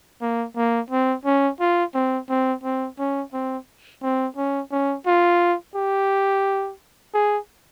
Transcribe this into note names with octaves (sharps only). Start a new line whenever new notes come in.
A#3
A#3
C4
C#4
F4
C4
C4
C4
C#4
C4
C4
C#4
C#4
F4
G4
G#4